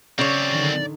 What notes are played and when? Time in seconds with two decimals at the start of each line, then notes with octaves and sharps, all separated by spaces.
0.19 F#2 C#3 C4 C#5 D5
0.52 D3 D#3